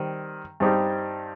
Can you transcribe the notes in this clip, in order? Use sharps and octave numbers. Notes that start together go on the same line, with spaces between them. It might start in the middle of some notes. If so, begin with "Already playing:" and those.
Already playing: D#3 G3 C4
G2 G3 C4 D#4 G4